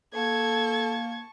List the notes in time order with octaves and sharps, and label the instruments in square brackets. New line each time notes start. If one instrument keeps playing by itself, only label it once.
[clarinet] A#3 [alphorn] A4 [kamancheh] A5 C#6 [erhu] G#6